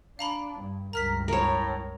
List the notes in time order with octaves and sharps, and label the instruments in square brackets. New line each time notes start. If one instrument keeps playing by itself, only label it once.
[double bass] D4 [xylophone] F5 A#5 B5
[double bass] G2
[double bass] C#2 G2 [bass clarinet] A#4 [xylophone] A#5 F6 B6
[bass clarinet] A2 [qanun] A#4 C#5